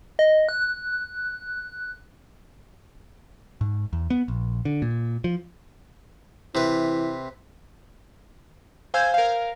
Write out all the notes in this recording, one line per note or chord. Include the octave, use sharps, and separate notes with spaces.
D#5
F#6
G#2
E2
B3
A#1
D3
A#2
F3
C3 E3 B4
C5 F5 G#5 E6 G6 G#6
A#4 F5